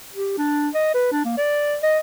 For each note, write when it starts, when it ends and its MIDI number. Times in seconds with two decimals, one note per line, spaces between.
0.14 0.36 67
0.38 0.69 62
0.74 0.91 75
0.94 1.09 71
1.12 1.23 62
1.25 1.35 58
1.37 1.76 74
1.83 1.99 75